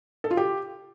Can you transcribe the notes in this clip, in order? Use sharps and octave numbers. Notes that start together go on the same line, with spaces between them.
A4
F4
G4